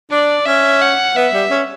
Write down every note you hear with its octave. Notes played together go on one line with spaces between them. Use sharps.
D4 D5
C#4 E5
F#5
B3 E5
G3
C#4